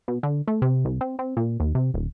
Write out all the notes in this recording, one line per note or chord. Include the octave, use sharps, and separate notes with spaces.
B2
D3
A3
C3
C2
C4
C4
A#2
D#2
C3
D#1